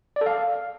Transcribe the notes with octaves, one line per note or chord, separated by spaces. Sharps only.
D5
A4
F5